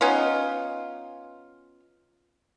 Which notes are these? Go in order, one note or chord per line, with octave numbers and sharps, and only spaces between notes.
B3 C#4 D#4 F4